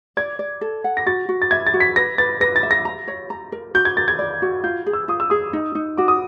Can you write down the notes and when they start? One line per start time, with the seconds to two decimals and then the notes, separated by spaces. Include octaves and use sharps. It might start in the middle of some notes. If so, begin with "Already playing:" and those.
0.17 D5 G#6
0.39 D5
0.61 A4
0.84 F#5
0.97 A#6
1.06 F#4 A6
1.29 F#4
1.42 A6
1.51 E5 G#6
1.67 A6
1.74 F#4
1.80 B6
1.96 B4 A#6
2.18 B4 A6
2.41 B4 A#6
2.56 A6
2.63 E5
2.71 A#6
2.85 A#5
3.08 C#5
3.30 A#5
3.52 A#4
3.74 F#4 G6
3.85 G#6
3.97 A#4 A6
4.08 G#6
4.19 D5
4.42 F#4
4.64 F4 G6
4.86 G#4
4.93 E6
5.08 F4 D#6
5.20 E6
5.30 G#4 D#6
5.53 D#4
5.75 D#4
5.97 F#4 D6
6.08 D#6